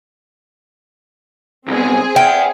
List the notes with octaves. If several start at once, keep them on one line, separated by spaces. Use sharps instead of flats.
C2 B2 C4 G#4
E5 F#5 G5